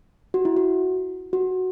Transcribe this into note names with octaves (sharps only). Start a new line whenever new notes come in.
F#4
E4
F#4
F#4